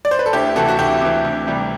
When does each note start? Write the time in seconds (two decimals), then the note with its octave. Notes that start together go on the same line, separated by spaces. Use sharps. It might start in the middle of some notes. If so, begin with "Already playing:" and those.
0.05 D5
0.11 C5
0.19 B4
0.26 A4
0.33 D2 E4 G4
0.56 C3 E3 F#4 A4
0.69 F#4
0.79 D2 E4 G4
1.01 C3 E3
1.24 D2
1.47 C3 E3 G3